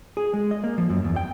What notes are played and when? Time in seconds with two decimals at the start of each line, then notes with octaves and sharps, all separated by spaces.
0.17 G#4
0.34 G#3
0.51 D#5
0.64 A#3
0.78 F3
0.90 F#2
1.04 E2
1.16 G5